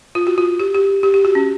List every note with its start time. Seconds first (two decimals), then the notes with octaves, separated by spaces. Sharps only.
0.15 F4
0.27 F#4
0.38 F4
0.59 G4
0.75 G4
1.03 G4
1.14 G4
1.25 F#4
1.35 C#4